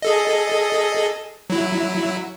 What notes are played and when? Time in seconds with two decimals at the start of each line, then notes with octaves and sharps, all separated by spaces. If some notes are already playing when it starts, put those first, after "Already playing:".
0.02 G#4 A4 D#5
1.50 F#3 E4